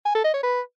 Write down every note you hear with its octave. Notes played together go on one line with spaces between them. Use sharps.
G#5
A4
D#5
C#5
B4